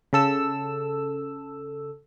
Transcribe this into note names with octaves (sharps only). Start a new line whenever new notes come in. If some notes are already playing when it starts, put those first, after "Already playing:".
C#3 A4 E6